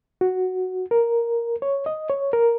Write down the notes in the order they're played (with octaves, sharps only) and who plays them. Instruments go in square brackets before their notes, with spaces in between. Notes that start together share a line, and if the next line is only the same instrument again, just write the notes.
[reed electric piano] F#4
A#4
C#5
D#5
C#5
A#4